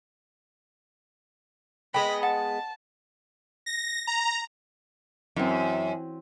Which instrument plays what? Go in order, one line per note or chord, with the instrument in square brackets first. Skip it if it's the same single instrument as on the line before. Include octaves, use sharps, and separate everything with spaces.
[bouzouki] G#3 B3 [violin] D#5 B5 [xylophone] G5
[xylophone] F#5 [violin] A5
[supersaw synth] A#6
A#5
[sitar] F#2 [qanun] E3 C4